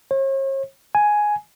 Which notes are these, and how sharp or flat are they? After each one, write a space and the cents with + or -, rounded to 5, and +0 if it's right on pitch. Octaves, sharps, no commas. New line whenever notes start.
C#5 -45
G#5 +5